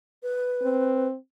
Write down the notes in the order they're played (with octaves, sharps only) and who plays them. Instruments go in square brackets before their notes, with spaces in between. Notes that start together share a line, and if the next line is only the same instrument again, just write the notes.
[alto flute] B4
[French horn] C4